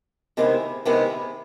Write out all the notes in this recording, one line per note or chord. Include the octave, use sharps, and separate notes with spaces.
C3 D#3 G#3 B3 E4
C3 D#3 G#3 B3 E4